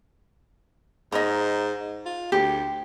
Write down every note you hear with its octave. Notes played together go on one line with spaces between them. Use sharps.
G#2 D#5 A#5
F4
D2 G4